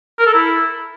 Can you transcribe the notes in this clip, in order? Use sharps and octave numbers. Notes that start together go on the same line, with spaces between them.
A#4
A4
E4